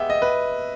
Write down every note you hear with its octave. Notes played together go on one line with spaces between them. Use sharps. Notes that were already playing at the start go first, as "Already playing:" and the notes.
Already playing: G#3 B3 G4 E5
D#5
B4